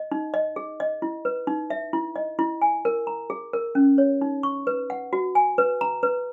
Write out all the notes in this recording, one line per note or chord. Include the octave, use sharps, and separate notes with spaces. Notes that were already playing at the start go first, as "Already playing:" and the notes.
Already playing: D#5
D#4
D#5
G#4
D#5
E4
B4
D#4
E5
E4
D#5
E4
G#5
A#4
A#5
G#4
A#4
C#4
C#5
D#4
C#6
B4
F#5
F#4
G#5
B4
A#5
B4